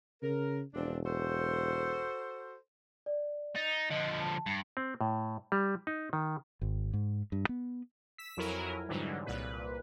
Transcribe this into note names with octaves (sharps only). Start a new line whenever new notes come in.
C#3 A#4
E1 F3 C4 D4
F#4 A4 C5
D5
D#4 A6
D3 F3 D#5
A5
G2
C4
A2
G3
D#4
D#3
G#1
G#2
G2
B3
E6 B6
F2 F#3 E4 A#4 G#5
G#2 D3 E3 F#3 G3
C2 A#2 B4